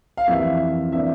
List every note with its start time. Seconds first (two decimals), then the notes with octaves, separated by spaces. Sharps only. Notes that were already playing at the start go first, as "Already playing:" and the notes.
0.17 F5
0.27 F2 E3 G3 A#3 E5
0.92 C3 E3 A#3 D4 E5